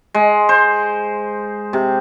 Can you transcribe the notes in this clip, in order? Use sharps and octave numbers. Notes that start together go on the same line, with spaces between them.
G#3
C5
C3